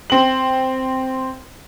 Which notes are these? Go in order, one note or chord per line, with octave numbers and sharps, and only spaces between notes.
C4 F#7